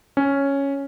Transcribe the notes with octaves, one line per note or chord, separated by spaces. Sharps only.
C#4